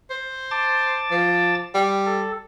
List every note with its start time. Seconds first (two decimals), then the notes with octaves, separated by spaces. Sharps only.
0.10 C5
0.51 A5 D6 A6
1.11 F3
1.75 G3
2.06 A4